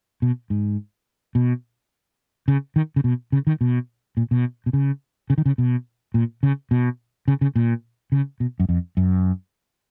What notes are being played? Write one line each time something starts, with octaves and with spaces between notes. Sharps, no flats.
B2
G#2
B2
C#3
D#3
C#3
B2
C#3
D#3
B2
A#2
B2
B2
C#3
C#3
D#3
C#3
B2
A#2
C#3
B2
C#3
C#3
A#2
C#3
B2
F#2
F2
F#2